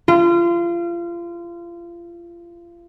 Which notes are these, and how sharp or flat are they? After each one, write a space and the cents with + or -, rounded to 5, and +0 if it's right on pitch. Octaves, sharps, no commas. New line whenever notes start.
F4 -30